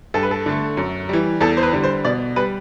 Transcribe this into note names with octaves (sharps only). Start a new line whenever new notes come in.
G2 A4
B4
A4
D3 A3
F#2
E3 G3
E2 A4
C5
B4
D3 G3
C5
B2 D5
G3 B4